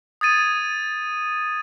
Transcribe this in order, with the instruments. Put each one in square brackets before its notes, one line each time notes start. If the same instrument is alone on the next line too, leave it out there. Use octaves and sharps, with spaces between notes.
[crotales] D#6 G#6 A6 D#7